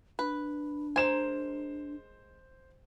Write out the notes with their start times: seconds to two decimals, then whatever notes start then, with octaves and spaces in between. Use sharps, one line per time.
0.19 D4 B4
0.96 G#3 A#4 C5 G#5 E7